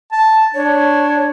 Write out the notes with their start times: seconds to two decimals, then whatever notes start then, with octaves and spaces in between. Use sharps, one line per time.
0.12 A5
0.54 D4 C#5